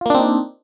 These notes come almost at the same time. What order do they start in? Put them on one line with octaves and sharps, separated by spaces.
F4 A#3 D4 C4 D#4